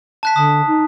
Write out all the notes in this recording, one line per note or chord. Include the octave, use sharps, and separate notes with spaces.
A5 F#6 B6
D3 A5 D#6
D#4